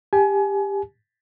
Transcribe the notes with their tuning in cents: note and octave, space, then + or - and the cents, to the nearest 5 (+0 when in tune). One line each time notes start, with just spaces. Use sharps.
G4 +20 G#5 +30